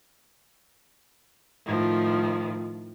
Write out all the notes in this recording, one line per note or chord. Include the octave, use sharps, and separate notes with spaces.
A2 D#3 F3